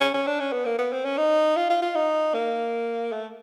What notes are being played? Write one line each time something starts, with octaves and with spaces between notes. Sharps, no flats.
C#4
C#4
D4
C#4
B3
A#3
B3
C4
C#4
D#4
F4
F4
F4
D#4
A#3
A3